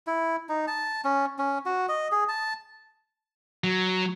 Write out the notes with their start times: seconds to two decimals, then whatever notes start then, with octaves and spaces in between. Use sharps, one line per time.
0.07 E4
0.49 D#4
0.67 A5
1.05 C#4
1.38 C#4
1.66 F#4
1.89 D#5
2.12 G#4
2.29 A5
3.64 F#3